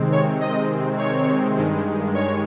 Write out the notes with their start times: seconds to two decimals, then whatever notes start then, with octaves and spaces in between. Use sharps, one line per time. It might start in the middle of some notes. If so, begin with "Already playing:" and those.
Already playing: C3 D#3 G#3 C4
0.12 C#5
0.41 D#5
0.98 C#5
1.56 G2 D#3 G#3
2.15 C#5